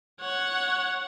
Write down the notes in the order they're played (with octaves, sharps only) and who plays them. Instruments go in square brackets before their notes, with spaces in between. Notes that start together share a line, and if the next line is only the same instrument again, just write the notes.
[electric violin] C#5 F#5